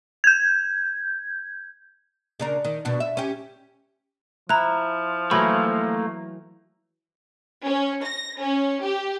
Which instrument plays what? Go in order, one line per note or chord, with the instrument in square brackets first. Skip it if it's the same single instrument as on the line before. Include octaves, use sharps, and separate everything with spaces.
[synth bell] G6 G#6
[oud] C#3 D4 A#4
D#3
B2 D4 F#4
E5
C#4 G4
[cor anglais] F3 [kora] E4 [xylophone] A#5 F#6
[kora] E3 F#3 [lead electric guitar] A3 A#3 [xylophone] B5
[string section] C#4
A#6
C#4
G4